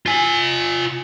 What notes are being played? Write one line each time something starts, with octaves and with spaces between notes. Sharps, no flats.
F4 G#5